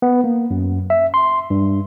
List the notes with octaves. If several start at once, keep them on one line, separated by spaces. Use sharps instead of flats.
B3
A#3
F#2
E5
C6
G2